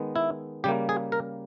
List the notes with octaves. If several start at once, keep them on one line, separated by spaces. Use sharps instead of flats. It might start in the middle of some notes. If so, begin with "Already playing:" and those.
Already playing: D#3 G#3 B3
E4
C#3 G3 A#3 G4
G#4
A#4